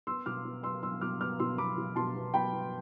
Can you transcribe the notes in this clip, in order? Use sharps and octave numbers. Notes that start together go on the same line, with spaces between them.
B3 C6 E6
B2 D6 F6
B3
B3 C6 E6
B3 C6 E6
B2 D6 F6
B3 D6 F6
B2 C6 E6
B2 B5 D6
B2
B2 A5 C6
B3
B2 G5 B5
B3